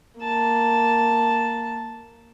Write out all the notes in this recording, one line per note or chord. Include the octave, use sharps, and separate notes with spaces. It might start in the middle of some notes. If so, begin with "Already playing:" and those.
A#3 A5